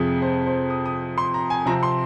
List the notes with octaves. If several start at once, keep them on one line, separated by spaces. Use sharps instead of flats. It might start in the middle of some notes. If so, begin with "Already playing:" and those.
Already playing: F2 C3 F3 G#4
C5
C5
D#6
D#6
C6
A#5
G#5
C3 F3 C4 A#5
C6